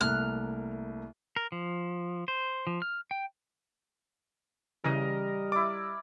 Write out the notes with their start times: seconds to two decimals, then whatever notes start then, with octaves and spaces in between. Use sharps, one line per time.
0.01 C2 A3 A#3 F6 F#6
1.36 A#4
1.52 F3
2.28 C5
2.67 F3
2.82 F6
3.11 G5
4.84 C#3 E3 G3 A#4 D#5
5.52 E4 D5 D6